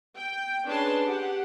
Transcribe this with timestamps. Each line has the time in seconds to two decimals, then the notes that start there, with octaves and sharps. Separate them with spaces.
0.16 G5
0.66 C#4 D4 G#4 B4 A5 C6
1.05 G4 F#5